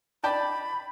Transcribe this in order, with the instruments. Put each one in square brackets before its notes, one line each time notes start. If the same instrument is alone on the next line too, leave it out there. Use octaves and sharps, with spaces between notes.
[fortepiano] D5 G5 A5 [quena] B5